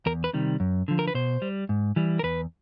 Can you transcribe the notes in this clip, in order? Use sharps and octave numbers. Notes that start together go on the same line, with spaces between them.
E2 A#4
B4
C3 D#3 G3
F#2
D3 F3
A#4
B4
B2 C5
G3
G#2
E3 G3
A#4
E2 B4